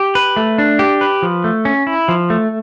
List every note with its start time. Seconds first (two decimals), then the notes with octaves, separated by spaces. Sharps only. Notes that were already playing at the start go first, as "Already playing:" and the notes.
Already playing: G4
0.15 B4
0.37 A3
0.58 D4
0.79 G4
1.01 B4
1.23 F3
1.44 A3
1.65 C#4
1.87 E4
2.08 F3
2.30 A3